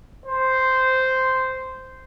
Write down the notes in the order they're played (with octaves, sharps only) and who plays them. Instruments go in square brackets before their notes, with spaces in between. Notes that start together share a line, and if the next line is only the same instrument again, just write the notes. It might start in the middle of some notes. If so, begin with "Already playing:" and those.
[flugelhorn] C5